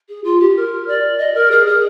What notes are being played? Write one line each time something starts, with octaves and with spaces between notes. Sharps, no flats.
G#4
F4
G4
A#4
D5
D#5
A#4
G#4
G#4